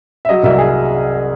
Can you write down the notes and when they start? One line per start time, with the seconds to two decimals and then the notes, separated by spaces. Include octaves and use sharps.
0.25 E5
0.29 F#3 D#5
0.43 C2 E5
0.58 G#4